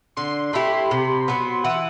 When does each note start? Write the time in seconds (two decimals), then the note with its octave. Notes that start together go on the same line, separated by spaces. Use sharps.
0.17 D3 C6
0.53 A3 E4 G4 B5
0.91 C3
1.28 F#3 B3
1.64 E3 F#5